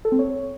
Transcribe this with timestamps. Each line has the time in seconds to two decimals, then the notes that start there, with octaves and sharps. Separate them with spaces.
0.05 A4
0.12 C4
0.19 C#5